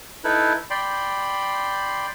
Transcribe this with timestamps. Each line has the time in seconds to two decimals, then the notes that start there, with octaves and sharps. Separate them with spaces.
0.24 D#4 E4 A4 B4
0.70 D5 G5 B5 C6